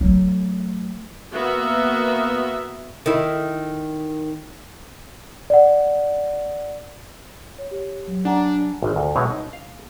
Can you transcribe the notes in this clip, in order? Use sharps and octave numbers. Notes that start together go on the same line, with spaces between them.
F#3 A3
A#3 B3 F#4 E5
D#3 E4
D5 F#5
C#5
G4 C#5
F#3
D4 F#5 G#5 A#5
G#1
D2
B2 F#3 G#3 C4 B4 C#5
D#4
F5